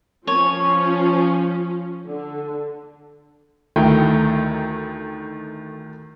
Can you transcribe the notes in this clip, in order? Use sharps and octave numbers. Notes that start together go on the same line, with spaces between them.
F3 C#4 C#5
D3
D2 D#3 A3 D#4 E4 G5